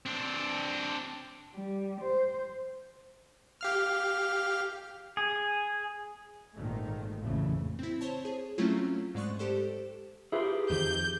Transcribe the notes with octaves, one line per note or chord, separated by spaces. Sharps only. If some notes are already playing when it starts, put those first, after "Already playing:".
C4 D4
G3
C5
G4 F5 F6
G#4
G#1 A#2 D#3 A3
A1 F2 A#2 C#3 E3 A3
C4 E4
C5 C#5 A5
G#4
F#3 A3 C4 C#4 E4 F4
G#2 G#3 D5 C#6 F#6
G4 A4 C5
E4 F4 G4 G#4 A#4 B4
F2 D#3 G6